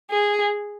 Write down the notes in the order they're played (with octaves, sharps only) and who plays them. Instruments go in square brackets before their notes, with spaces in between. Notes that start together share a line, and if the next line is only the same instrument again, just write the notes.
[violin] G#4